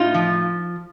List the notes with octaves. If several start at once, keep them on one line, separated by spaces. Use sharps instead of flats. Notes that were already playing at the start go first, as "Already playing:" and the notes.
Already playing: A2 D#4 F4
F3